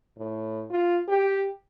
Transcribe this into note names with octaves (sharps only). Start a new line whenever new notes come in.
A2
F4
G4